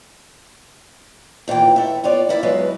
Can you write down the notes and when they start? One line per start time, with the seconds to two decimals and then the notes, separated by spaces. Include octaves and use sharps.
1.48 D#2 A#2 E3 G5
1.76 A3 E5
2.04 B3 F4 C#5 D5
2.29 A#3 E4 D5 E5
2.43 E2 F#3 G#3 B4 E5